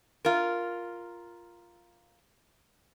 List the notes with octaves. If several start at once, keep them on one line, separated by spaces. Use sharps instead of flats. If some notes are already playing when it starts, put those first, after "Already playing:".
F4 A#4